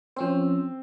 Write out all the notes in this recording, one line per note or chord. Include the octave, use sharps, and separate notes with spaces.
F3 C4 C#4 C5